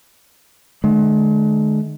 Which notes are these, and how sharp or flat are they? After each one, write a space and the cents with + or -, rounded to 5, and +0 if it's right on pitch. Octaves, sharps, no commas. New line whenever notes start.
D#3 -45 G#3 +45